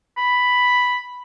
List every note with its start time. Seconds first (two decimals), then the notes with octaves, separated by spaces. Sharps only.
0.17 B5